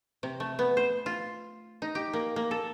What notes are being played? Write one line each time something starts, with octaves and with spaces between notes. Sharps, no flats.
C3
A3
B3
C5
F4
D#4
G4
A#3
A#3
A4